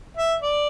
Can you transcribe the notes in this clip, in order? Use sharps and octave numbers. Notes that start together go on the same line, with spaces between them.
E5
D5